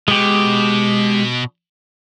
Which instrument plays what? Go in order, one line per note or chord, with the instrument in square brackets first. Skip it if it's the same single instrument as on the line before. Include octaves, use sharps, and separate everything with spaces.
[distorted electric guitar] B2 [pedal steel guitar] G#3 G4